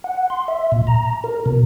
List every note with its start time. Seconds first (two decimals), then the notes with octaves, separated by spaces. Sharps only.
0.04 F#5
0.30 C6
0.48 E5
0.72 A#2
0.87 A#5
1.24 A#4
1.46 B2